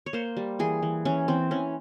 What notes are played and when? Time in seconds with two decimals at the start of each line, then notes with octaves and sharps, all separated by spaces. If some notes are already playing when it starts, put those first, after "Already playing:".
0.06 C#5
0.13 A#3 C5
0.37 G3
0.59 E3 G#4
0.82 E3
1.05 E3 C#4
1.28 E3 C4
1.51 E3 C#4